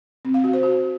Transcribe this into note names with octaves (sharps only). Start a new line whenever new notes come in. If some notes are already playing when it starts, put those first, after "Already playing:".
C4
F5
F#4
C5
F#4